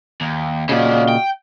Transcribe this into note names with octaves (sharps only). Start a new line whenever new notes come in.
D#2
A#2 C#3 C#4 F#4 D5 D#5 F5
G5